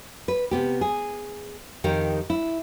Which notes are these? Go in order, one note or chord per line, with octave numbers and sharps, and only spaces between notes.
B4
C3 B3 G4
G#4
F2 D#3 G4 A#4
E4